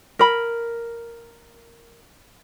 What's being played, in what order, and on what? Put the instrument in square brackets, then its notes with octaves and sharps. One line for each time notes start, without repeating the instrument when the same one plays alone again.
[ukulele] A#4 B5